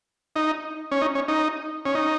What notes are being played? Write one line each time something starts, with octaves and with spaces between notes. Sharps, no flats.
D#4
C#4
D#4
C#4
D#4
C#4
D#4